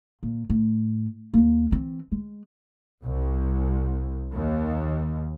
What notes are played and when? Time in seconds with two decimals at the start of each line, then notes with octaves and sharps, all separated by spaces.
0.23 A#2
0.50 A2
1.34 D#2 A#3
1.71 E3 C4
2.12 G#3
3.04 C2
4.33 D#2